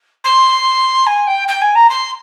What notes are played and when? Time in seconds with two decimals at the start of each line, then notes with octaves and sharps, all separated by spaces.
0.24 C6
1.06 G#5
1.27 G5
1.48 G5
1.61 G#5
1.75 A#5
1.89 C6